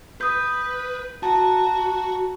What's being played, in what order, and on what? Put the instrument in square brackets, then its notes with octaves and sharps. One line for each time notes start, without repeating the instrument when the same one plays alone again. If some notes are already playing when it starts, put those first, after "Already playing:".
[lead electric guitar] B4 [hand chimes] D#6 G6
[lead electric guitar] F#4 [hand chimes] A5 A#5